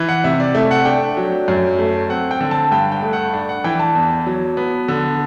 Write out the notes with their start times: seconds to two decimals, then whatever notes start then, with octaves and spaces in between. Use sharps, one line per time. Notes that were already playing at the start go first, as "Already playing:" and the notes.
Already playing: E3
0.09 F#5
0.24 C3 E5
0.40 D5
0.55 A3 E5
0.71 F#5
0.85 D4 G5
1.17 F#3
1.48 F#2
1.79 A3
2.09 C4 F#5
2.31 G5
2.41 D3
2.51 A5
2.72 G2 G5
2.92 G5
3.02 A3
3.13 F#5
3.33 D4 D5
3.49 F#5
3.64 E3 G5
3.79 A5
3.95 E2
4.26 F#3
4.57 B3
4.88 D3